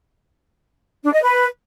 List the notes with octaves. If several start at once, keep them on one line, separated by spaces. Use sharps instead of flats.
D4
D#5
B4